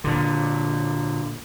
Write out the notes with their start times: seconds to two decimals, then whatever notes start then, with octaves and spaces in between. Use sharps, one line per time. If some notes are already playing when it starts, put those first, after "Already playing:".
0.04 A#2 D3